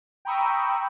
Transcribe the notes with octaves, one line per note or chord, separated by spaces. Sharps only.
G5 A#5 B5 C#6 D#6 E6